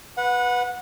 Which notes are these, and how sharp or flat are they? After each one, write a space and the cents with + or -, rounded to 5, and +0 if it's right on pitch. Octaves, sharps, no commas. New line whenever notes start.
B4 -5 F#5 -20